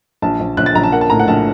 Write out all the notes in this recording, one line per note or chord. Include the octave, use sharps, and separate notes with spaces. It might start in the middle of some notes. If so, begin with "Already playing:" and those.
A#1 A5
A#1
A#1 F#6
A6
A#1 A#5
A5
A#3 F#5
A5
A2 A#5
F#5
A#1 A5